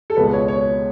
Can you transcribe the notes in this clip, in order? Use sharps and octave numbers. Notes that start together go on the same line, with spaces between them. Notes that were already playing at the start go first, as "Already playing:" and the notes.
A4
C#2 B2 G#3 B4
C#5
C#5